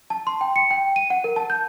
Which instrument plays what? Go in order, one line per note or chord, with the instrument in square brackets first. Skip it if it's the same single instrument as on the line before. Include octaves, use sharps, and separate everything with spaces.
[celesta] A5
C6
G5
C#7
G5
D#7
F#5
A#4
A5
G6